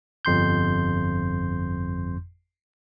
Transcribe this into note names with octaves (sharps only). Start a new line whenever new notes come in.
G1 F2 C6 G6